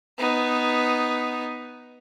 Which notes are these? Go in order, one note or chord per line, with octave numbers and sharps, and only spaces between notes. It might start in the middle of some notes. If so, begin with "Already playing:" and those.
B3 D#4